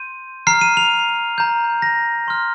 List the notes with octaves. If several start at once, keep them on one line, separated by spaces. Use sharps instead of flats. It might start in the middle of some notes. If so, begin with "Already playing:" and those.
Already playing: C6 G6 D#7
A#5 F6 C7
D#7
F7
A#5 G6
A#6
C6 F6